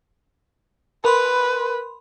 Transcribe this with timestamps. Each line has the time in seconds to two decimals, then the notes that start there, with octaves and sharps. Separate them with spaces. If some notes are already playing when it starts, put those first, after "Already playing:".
1.05 A#4 B4 B5 C6